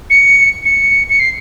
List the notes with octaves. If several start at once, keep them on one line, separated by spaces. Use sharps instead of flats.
C#7
C#7
C#7
C7